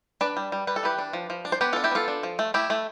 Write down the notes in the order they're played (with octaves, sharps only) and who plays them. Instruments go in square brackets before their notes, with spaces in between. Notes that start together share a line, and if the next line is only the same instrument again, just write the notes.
[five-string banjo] D4 B4 D5
G3
G3
G3 B4
A4
E3 G4 B4
D4
F3
F3
D4
C5
B3 G4 B4
D4 F4 A4
E4 G4
B3 F4 A4
D4
F3
A3
A3 E4 G4
A3